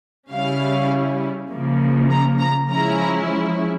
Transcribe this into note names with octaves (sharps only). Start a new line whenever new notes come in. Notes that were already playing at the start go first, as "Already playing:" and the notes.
C#3 G3 C#4 E4 F5
C#3 F3 A#3
A#5
A#5
F3 G#3 C#4 E4 A#5